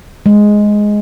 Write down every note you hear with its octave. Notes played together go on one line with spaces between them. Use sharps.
G#3